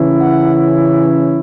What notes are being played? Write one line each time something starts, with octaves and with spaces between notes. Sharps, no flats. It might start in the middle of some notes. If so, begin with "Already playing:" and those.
Already playing: C#3 E3 C#4 E4
F#5